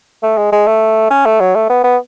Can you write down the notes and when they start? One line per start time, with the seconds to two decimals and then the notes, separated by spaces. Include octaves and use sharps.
0.23 A3
0.37 G#3
0.52 G#3
0.67 A3
1.11 C#4
1.25 A3
1.40 F#3
1.55 A3
1.69 B3
1.84 B3